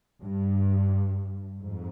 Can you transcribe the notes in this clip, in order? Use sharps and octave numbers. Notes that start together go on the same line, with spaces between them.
G2
F2 G#2